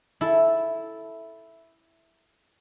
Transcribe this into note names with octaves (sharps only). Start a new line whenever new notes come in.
E4 A4